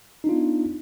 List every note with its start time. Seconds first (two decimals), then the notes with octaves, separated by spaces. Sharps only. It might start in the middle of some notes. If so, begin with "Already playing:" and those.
0.24 D#4
0.27 D4
0.29 F4
0.32 B3